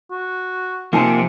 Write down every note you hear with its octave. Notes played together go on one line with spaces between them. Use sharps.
F#4
C3 F3 A#3 D#4 G#5 A5